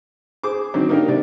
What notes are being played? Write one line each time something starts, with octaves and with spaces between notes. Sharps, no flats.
G#4 C5 D6
D3 D#3 F#3 C4 D#4
A#3 D4 D#4 G4 A#4
C3 D5